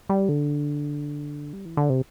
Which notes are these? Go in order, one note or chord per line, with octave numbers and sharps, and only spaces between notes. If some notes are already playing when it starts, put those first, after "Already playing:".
G3
D3
G3
E3
D3
C3